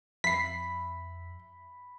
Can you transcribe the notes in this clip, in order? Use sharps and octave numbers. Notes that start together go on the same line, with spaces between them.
F2 E5 B5 B6 C7